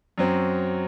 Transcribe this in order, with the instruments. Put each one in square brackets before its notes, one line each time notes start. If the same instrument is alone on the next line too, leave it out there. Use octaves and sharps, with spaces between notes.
[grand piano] F#2 F#3 C4